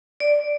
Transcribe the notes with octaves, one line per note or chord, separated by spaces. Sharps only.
D5